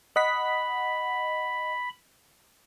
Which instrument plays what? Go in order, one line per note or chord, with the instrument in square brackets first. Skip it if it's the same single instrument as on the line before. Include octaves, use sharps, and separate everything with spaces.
[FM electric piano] D#5 F#5 B6 [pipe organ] B5